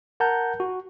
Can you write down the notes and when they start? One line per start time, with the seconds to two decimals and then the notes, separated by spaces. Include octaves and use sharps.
0.20 A#4 F#5 A5 A#5 G6
0.60 F#4